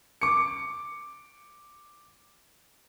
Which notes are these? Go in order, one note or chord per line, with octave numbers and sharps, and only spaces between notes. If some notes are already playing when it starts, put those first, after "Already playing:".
D6 C#7